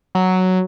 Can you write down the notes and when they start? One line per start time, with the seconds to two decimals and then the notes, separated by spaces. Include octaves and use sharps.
0.15 F#3